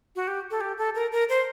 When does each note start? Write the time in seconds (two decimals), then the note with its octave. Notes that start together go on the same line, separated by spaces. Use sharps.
0.16 F#4
0.28 G4
0.51 A4
0.61 G4
0.78 A4
0.95 A#4
1.12 A#4
1.29 C5